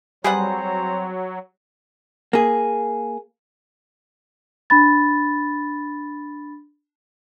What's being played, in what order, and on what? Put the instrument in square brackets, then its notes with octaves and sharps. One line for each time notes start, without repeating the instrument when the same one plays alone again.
[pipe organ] F#3 [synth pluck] G3 [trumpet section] C4 C5 A#5 [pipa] G#4 B4 F#5
[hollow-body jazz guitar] A#3 G#4
[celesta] D4 B5 A6